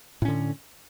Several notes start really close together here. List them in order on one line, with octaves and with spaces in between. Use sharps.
A2 C#4 D3